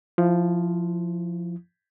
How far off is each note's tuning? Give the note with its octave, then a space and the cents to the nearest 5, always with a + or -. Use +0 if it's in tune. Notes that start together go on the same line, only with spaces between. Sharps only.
F3 +0 E4 +20